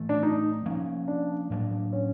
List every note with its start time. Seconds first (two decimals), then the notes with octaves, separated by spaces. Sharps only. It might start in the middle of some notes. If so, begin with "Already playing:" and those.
Already playing: A2 E3 A3
0.09 D4
0.23 D#4
0.65 F3 A#3 C#4
1.08 D4
1.50 A2 F#3 A#3 D4
1.93 C#4